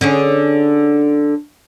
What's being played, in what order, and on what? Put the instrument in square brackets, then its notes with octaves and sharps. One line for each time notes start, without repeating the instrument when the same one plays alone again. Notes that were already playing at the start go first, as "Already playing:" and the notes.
[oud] D3 C#4 G#4